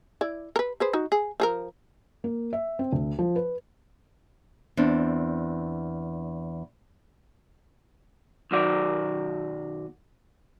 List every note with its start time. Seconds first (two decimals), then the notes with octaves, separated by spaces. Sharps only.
0.21 E4 D5
0.56 A#4 B4
0.80 G#4 B4 C5
0.93 D#4 F#4
1.12 G#4
1.40 F3 G#4 A#4
2.24 A#3
2.53 E5
2.79 C4
2.93 D2
3.19 F3
3.36 B4
4.77 E2 C4 D4
8.51 B1 F#2 D#3 F#4 D5